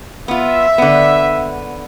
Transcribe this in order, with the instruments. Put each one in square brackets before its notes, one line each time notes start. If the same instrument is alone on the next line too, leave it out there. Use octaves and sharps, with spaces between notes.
[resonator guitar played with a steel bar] B3 F4 [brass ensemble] E5
[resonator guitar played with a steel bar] D3 B3